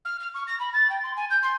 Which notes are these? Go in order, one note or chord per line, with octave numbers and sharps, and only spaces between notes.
F6
F6
C#6
A#6
B5
A6
G5
C6
G#5
G6
C6